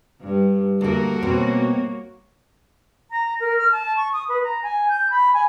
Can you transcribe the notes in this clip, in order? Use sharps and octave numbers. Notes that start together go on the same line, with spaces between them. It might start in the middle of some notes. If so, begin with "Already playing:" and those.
G2
D2 A#3 F#4 A4 A#4
B2 A#3 C4 C#5
A#5
A#4
F6
A5
C#6
D#6
B4
A#5
G#5
G6
B5
G#5